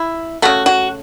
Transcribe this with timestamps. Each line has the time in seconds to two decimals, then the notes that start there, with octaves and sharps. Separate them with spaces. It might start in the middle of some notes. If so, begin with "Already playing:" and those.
Already playing: E4
0.42 C#3 A3 F#4
0.66 F#4